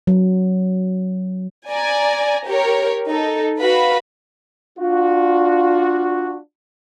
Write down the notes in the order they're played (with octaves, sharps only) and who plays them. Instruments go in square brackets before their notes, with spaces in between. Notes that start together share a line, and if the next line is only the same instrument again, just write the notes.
[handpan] F#3
[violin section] D5 G#5 A#5
G4 A#4 C#5
D#4 A4
F#4 B4 F5 B5
[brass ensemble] D4 F4 F#4